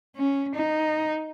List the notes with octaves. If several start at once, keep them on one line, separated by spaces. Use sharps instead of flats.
C#4
D#4